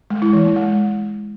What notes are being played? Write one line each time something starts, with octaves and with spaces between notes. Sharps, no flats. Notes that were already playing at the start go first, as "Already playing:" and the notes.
G#3
E4
E3
A#3
G#3